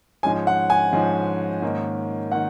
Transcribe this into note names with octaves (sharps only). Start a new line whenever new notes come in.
G#2 F3 G#3 C#4 G#5
F#5
G#5
G#2 F3 G#3 C#4
G#2 D#3 A#3 C#4
D#3 A#3 C#4 F#5